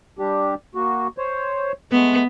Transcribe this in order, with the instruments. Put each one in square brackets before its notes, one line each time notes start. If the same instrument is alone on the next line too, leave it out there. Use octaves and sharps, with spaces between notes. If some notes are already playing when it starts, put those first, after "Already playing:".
[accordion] G3 D4 G4
A#3 F#4
C5 C#5
[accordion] G#3 A3 [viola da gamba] B3